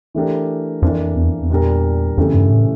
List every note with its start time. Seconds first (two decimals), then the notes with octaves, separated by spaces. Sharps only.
0.15 E3 A3 D4 G4 A#4
0.82 F2 E3 A#3 D4
1.16 E2
1.28 F2
1.41 E2
1.50 A#2 G3 D4 G4 A#4
2.17 F2 C#3 E3 A3 C#4 G4
2.34 G2
2.51 A2